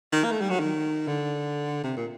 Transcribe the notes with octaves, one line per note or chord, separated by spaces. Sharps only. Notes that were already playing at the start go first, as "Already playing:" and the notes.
D#3
A#3
A3
G3
F#3
D#3
D3
C3
A#2